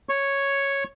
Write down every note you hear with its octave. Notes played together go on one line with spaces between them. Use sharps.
C#5 C#6